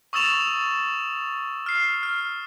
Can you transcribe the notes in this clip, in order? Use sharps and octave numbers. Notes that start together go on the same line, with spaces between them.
C#6 D#6 E6 A6 E7 F7
F6 C7
F6